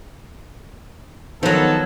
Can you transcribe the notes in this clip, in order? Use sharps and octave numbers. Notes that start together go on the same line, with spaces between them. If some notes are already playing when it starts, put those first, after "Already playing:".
D#3 F3 F#3 B3 A4